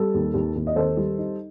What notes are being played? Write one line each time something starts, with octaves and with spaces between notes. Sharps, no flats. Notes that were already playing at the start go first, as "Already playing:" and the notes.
Already playing: G3 A4
D#2
D#2
D#2
D#5
D#3 A4 C5
G3
D#4